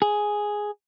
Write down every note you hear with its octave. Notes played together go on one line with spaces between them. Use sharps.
G#4